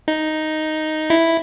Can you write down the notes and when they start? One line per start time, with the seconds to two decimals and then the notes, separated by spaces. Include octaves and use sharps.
0.08 D#4
1.10 E4